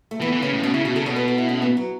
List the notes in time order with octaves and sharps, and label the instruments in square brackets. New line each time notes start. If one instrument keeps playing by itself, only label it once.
[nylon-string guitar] A3
[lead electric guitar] E3 [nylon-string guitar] B3
[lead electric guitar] E3
[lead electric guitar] C#3 [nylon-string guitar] C#4
[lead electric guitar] A2
[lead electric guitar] B2 [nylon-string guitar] C#4
[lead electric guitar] C#3 [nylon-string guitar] E4
[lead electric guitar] B2 [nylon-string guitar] F#4
[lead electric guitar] C#3 [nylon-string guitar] A4
[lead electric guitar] B2 [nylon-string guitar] C#5
[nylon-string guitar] B4
A4
E4
C#4
B3
F#3